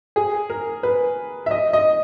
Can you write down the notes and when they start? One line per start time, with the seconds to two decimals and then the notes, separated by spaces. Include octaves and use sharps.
0.16 G#4
0.50 A#4
0.83 B4
1.46 E5
1.51 D#5
1.73 D#5